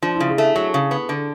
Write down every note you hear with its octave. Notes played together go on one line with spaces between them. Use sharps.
F3 D4
E4
C#3
G#4
A3
F#3 A4
C#3
B3
D3